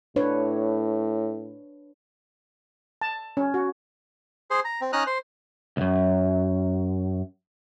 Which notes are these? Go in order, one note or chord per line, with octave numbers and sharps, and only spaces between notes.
A2 D4 B4 C#5
A5
C#4
F#4
G#4 C5
A#5
C4
C#4 D#4 A#5 D#6 F6 F#6
C5
C#2 F#2